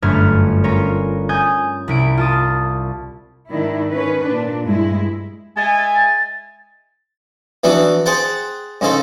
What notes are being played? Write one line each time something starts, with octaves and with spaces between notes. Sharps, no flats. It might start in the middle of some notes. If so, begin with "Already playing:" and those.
G1 F#2 A3 F6 G#6
C#4 F4 A#4 C#5
G#5 D#6 G6 G#6
C2 E4 D7
F4 A5 D#6
G#2 D#3 D4 E4
D#3 C#4 B4
A#2 D4
G2 G#3 E4
G#3 E5 G#5 A6
E3 B3 D4 F#4
G#4 C5 F#5 G5 A5
G#2 C#3 G#4 A4 C5